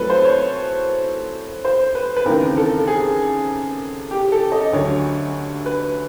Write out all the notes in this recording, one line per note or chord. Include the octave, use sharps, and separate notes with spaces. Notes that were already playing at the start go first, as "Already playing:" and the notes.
Already playing: A2 F#3 A3 C4 A4 B4
C5
C#5
C5
B4
B4
D#2 C#3 E3 G#3 C4 A#4
A4
G#4
G4
A4
D#5
D2 D3 F#3 C#5
B4